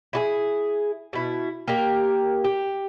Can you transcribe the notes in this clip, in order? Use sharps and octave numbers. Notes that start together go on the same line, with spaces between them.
E4 F#4 G#4
B2 E4
A#3 G4 A#4
G4